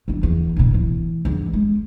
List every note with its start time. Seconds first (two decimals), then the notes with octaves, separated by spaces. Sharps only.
0.08 F2 D3
0.23 E2
0.56 D1 B2
0.74 E3
1.25 E2 G2
1.53 G#3